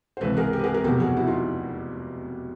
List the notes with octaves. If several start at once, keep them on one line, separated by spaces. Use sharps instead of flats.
C5
C#2 C3 E3 A4 B4
G#4 A#4
G4 A4
B4
G#4 A#4
G#4 A#4
F1 E2 B2 F#3 G4 A4
F#4 G#4
E4 F#4
D#4 F4